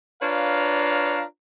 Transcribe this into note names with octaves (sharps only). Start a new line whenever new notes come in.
D4 F4 B4 C#5 F5 A#5